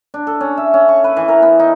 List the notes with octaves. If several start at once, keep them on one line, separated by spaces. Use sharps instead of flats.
D4
A4
C#4
E5
C#4
C#6
B4
E3
A#4
B3
D#4